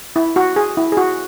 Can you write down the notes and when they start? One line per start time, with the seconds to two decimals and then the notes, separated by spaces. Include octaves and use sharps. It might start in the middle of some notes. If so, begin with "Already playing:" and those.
0.16 E4
0.36 F#4
0.56 G#4
0.77 E4
0.92 G#4
0.97 F#4